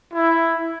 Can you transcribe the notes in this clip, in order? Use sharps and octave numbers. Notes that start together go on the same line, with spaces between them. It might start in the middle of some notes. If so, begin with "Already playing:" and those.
E4